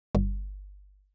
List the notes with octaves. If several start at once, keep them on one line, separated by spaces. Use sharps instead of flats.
G1